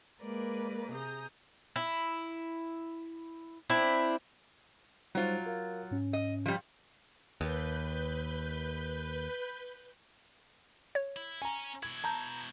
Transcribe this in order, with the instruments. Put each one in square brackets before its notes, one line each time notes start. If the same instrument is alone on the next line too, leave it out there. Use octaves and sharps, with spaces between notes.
[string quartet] G#3 A#3 A#4 B4 D5
C3 G#4 A#5 D#6 G6
[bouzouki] E4
C4 D4 E4
[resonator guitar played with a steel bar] F#3 F4 [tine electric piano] G3 D#4 C5
[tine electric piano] A#4 F5
G#2 C#4
[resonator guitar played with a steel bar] D#5
F3 G3
[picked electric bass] D#2 [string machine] B4 G6
[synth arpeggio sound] C#5
[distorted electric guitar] E4
[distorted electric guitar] C#4 [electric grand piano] G#5 A#5
[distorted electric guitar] B2 E4 [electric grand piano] G#6
[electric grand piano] A5 A#5 G6